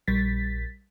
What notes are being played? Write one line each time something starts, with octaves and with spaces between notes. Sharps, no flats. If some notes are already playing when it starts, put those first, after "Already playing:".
A#1 G3 A6 B6